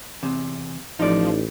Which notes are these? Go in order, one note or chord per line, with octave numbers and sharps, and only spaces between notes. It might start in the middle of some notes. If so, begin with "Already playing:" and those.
E2 C3
A1 F3 D#4 D5